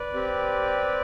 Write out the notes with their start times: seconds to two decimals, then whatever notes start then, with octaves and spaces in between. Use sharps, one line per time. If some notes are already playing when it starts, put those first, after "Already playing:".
Already playing: B4 D5
0.14 C4 G4